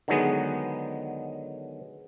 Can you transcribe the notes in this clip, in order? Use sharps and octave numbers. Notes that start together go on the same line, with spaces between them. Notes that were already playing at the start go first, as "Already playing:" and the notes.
D3 D#3 F#3 G#3 B3